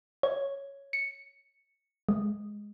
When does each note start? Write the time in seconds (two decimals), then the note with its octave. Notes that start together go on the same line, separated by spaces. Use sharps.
0.23 C#5
0.93 C#7
2.09 G#3